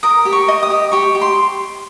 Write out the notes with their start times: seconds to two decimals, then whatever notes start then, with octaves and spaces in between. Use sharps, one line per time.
0.03 A#4 D#6
0.25 G4
0.32 C#6
0.48 D#5
0.63 D#6
0.70 G4
0.92 G4 C#6
1.15 G4
1.21 C6